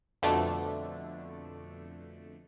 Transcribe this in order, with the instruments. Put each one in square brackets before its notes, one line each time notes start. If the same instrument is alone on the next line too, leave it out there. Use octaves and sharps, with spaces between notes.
[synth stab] F2 B2 D3 A3 D4